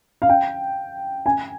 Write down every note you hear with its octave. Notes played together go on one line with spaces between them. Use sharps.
F5
G5
G#5